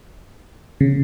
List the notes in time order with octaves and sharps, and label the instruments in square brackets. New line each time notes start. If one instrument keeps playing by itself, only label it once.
[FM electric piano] C#3